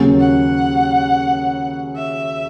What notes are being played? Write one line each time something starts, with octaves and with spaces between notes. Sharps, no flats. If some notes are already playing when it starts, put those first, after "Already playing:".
Already playing: D#2 C#3 F#3 A#3 C#4
F#5
E5